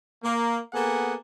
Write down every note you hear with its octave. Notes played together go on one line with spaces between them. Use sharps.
A#3
A#3 B3 G#4 A4 F#5 G#5